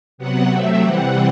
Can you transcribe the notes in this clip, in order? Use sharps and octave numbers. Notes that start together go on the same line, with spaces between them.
C3 F#3 B3 F#5
C3 F#3 A3 C4 E5
C3 E3 G3 C4 F#5